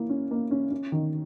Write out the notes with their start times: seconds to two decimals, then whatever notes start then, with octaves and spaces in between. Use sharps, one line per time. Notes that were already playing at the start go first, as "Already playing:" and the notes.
Already playing: A#3 E4
0.09 C#4
0.31 A#3
0.51 C#4
0.71 C#4
0.92 D#3